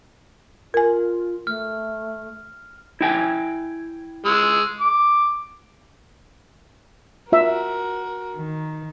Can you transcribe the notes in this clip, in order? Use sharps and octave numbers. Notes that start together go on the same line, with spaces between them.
F4 A#4 G#5
A3 F6
E4 G5 G#5
G#3 E6
D6
F4 F#4 A#4 E5
D#3